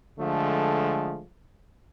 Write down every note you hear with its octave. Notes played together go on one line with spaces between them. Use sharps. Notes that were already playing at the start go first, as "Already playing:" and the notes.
D3 F3 G#3 A3